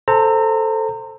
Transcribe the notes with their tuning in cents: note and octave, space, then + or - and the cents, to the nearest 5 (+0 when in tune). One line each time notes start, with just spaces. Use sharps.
A4 +0 C5 +0 A#5 -30